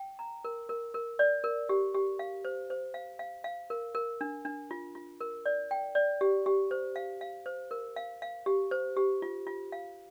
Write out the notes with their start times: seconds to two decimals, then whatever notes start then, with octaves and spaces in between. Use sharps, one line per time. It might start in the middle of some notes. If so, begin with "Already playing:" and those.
Already playing: G5
0.19 A#5
0.45 A#4
0.69 A#4
0.94 A#4
1.19 D5
1.44 A#4
1.69 G4
1.94 G4
2.19 F5
2.45 C5
2.70 C5
2.94 F5
3.19 F5
3.44 F5
3.70 A#4
3.95 A#4
4.21 D4
4.45 D4
4.71 F4
4.95 F4
5.21 A#4
5.46 D5
5.71 G5
5.95 D5
6.21 G4
6.46 G4
6.71 C5
6.96 F5
7.21 F5
7.46 C5
7.71 A#4
7.96 F5
8.22 F5
8.46 G4
8.71 C5
8.97 G4
9.22 F4
9.47 F4
9.72 F5